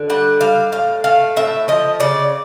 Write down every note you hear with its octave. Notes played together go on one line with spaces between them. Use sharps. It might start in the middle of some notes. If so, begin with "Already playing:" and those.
Already playing: D3
G3 F#5
G3 F5
A2 F5
A3 F5
A2 E5
F3 D#5
C#3 D5